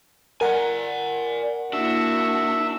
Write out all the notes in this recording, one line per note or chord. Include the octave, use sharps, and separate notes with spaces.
A#4 D5 F#5 G#5
A#3 D4 E4 F#4 E5